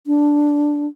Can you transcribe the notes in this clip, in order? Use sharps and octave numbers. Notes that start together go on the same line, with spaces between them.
D4